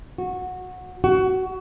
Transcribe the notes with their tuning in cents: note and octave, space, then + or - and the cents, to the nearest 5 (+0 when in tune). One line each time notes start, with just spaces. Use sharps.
F#4 -15
F#4 +20